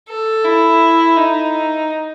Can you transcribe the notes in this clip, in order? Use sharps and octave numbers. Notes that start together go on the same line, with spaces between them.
A4
E4
D#4